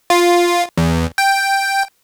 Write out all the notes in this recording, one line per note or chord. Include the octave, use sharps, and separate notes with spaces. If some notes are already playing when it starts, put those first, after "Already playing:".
F4
E2
G5